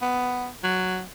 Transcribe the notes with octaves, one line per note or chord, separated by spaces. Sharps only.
B3
F#3